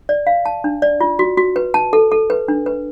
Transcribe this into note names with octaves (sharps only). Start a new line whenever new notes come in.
D5
F5
A5
D4
D5
F4
F#4
F#4
B4
A5
A4
A4
B4
D4
B4